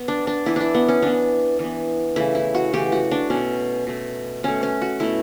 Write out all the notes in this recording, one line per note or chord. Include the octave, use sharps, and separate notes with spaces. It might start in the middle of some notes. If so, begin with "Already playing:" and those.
Already playing: B3
D4
D4
E3 B3 E4
D4 E4
B3
C#4
E3 B3 D4
E3 B3
C#3 E3 A3 E4
E4
F#4
C#3 E3 A3 G4
F#4
D4
B2 A3 C#4
B2 A3
B2 A3 C#4
C#4
F#4
B2 A3 E4